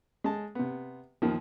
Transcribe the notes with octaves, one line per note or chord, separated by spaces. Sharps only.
G#3 A5
C3 B3
D#2 D#3 F3